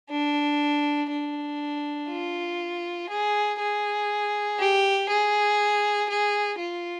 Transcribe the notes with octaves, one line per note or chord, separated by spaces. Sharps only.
D4
D4
F4
G#4
G#4
G4
G#4
G#4
F4